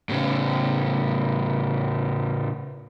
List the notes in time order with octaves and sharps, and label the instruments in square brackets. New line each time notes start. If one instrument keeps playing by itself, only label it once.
[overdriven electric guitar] A2 C#3